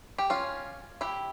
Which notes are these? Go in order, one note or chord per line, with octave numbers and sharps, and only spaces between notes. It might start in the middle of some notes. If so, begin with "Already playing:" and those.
G4
C#4 F4
E4 G4